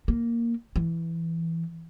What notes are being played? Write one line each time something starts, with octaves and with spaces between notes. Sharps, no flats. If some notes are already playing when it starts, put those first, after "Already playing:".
A#3
E3